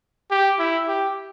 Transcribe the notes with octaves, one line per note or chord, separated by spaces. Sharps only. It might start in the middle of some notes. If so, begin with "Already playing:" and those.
G4
E4
G4